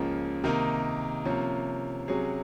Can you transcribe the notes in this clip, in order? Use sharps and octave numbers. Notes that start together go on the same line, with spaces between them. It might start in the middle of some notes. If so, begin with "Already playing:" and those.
Already playing: C#2 C#3 F3 A#3
C3 D#3 A#3 D#4
C3 F3 A#3 C#4
C3 F#3 C#4 G#4